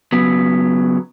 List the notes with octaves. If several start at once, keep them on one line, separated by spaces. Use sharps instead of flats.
C#3 F#3 B3